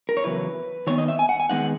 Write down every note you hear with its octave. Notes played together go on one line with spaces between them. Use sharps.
A#4
C#5
E2 C#3 F#3 E4 B4
D#3 G#3 B3 C#5
D#5
E5
G#5
F#5
G#5
D#3 G#3 B3 D#4 F#5